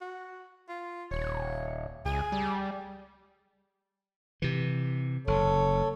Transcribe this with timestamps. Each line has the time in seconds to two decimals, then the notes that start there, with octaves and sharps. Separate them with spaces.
0.01 F#4
0.69 F4
1.11 D#1 C#5
2.06 C#2 G#4
2.32 G3
4.42 C3 E3
5.27 F#1 A4 C#5